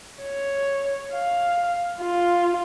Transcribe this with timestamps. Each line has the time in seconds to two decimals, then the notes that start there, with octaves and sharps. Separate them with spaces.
0.23 C#5
1.13 F5
2.00 F4